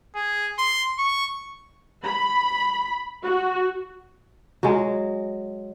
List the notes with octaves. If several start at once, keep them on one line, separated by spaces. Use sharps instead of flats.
G#4
C6
C#6
B5
F#4
F#3 G#3